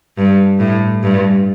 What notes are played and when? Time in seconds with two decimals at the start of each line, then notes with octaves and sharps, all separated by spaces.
0.17 G2
0.59 A2
1.03 G2